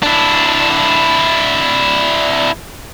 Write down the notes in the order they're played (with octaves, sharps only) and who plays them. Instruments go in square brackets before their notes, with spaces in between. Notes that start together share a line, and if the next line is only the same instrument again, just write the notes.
[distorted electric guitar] D4 E4